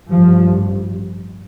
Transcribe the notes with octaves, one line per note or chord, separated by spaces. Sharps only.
A1 G2 F3